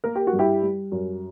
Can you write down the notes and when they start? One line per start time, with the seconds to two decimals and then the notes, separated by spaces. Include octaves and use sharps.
0.04 A#3 A#4
0.15 G4
0.27 F#4
0.33 G2
0.39 E4 G4
0.63 G3
0.92 F#2